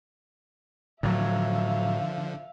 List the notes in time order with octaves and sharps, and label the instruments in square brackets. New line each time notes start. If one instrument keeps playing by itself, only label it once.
[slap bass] A2 F#3 [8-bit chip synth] D3 F3 [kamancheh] E5 F5